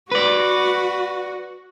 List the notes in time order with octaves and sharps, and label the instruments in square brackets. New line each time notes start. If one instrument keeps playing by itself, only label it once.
[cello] F#4 [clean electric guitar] B4 D5